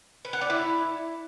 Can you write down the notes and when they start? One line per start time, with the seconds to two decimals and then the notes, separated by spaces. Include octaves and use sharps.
0.25 B4
0.33 F#5
0.41 D5
0.50 E4